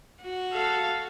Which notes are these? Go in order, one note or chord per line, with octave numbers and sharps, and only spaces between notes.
F#4
A4 F5